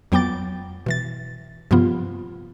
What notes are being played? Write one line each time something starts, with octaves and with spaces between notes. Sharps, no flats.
F2 F#3 B3 G5 D6 A6
B2 E3 A6
G2 C3 F3 B3 F4